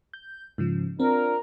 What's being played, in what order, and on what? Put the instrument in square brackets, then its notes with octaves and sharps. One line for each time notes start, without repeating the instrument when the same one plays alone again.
[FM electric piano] G6
G#2 C#3 F3
[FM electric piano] C4 [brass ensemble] D4 F4 A#4